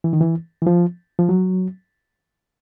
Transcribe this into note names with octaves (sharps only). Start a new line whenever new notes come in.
E3
D#3
E3
E3
F3
F3
F#3